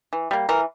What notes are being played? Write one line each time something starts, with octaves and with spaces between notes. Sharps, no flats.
E3
G3 A#3
E3 A#4